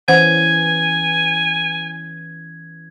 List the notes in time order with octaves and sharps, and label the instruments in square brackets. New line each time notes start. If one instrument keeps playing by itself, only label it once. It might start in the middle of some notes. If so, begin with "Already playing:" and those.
[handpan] E3 C#4 [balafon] C5 F#5 [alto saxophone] G#5 [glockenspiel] G#6